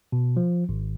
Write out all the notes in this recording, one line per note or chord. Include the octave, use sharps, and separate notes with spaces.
B2
F3
G#1